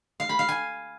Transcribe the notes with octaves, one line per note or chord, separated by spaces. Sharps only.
F5
B5
F5
G#5